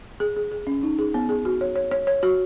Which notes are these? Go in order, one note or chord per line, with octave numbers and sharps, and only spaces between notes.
G#4
G#4
G#4
C#4
D#4
G#4
B3
G#4
F#4
C#5
C#5
C#5
C#5
F#4